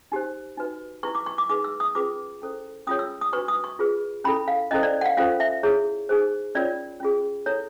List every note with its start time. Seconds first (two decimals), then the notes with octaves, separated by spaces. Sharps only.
0.12 D#4 G4 C5
0.57 D#4 F#4 B4
1.03 E4 G4 B4 C#6
1.15 D6
1.26 C#6
1.38 D6
1.49 D#4 G#4 B4 D6
1.64 E6
1.80 D#6
1.95 C#4 F4 G#4 B4 D6
2.41 C#4 E4 A4 C5
2.87 C#4 F4 G#4 C#5 D#6
2.99 E6
3.21 D#6
3.33 D4 F#4 B4 C#6
3.48 D#6
3.64 C#6
3.79 F4 G#4 B4
4.24 C#4 E4 A4 B5
4.48 F5
4.71 C#4 E4 A4 C5 D#5
4.83 D5
5.01 F#5
5.05 F5
5.17 C#4 F4 A4 C5 F5
5.40 E5
5.63 E4 G#4 C#5
6.09 D#4 G#4 C5
6.55 C#4 F4 A#4 C#5 D5
7.00 C#4 F4 G#4
7.46 E4 A4 C#5